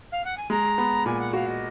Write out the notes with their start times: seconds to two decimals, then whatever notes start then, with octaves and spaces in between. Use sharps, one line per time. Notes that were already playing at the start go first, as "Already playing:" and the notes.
0.12 F5
0.24 F#5
0.37 G#5
0.50 G#3 A#5
0.78 B3
1.06 A#2 G#5
1.19 F#5
1.33 F#4 F5
1.47 D#5